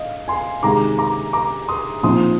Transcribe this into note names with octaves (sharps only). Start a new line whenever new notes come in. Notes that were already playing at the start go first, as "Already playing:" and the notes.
Already playing: D#5 F5
G#5 C6
C3 D#3 G#3 A#5 D6
A#5 D6
A#5 D6
C6 D#6
A#2 F3 C4 D#4 C6 D#6